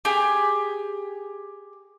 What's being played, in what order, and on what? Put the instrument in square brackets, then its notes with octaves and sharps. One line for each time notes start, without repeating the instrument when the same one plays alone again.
[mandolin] G4 G#4